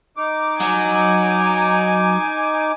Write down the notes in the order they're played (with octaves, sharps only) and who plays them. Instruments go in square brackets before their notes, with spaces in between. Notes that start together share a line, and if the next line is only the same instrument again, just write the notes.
[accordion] D#4 D6
[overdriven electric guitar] F#3 [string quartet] G#5